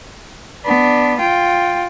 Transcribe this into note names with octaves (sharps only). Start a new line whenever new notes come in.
B3 D4
F4 G5